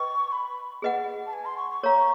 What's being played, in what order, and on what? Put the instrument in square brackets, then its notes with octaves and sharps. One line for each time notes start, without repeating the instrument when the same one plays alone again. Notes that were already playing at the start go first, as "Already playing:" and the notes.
Already playing: [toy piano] B4 D#5 G5 [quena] C#6
[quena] B5
[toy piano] G#4 B4 D#5 F#5
[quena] A5
G#5
C6
C#6
C#6
[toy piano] A#4 C#5 F5 A#5